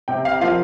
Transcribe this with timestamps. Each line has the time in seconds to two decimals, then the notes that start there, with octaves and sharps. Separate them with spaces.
0.08 C3 G5
0.25 F5
0.40 F3 A#3 F4 F5